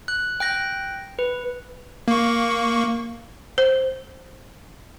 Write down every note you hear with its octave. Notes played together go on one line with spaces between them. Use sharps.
F#6
G5 F#6 A#6
B4
A#3 C#6
C5